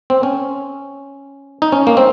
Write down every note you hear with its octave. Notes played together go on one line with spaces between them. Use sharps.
C4
C#4
D#4
C#4
A#3
C4